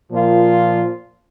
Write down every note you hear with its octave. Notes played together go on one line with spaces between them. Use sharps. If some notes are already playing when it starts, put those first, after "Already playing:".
A#2 F3 A#3 F4